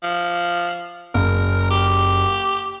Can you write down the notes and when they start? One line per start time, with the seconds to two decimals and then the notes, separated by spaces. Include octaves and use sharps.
0.03 F3
1.14 F#1 A#4
1.70 G4